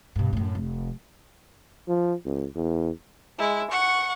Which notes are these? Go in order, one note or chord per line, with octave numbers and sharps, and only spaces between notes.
G2 B2
F#2 A2
F1
F3
C#2
E2
G#3 E4
F#5 C#6